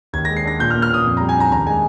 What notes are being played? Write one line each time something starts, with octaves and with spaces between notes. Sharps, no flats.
D#2 G#6
G#3 A#6
C7
D4 A#6
A#2 G6
F6
A#3
F6
A#2 D#6
F2
G3 A#5
G#5
D4 A#5
D#2 A#5
G#3 G#5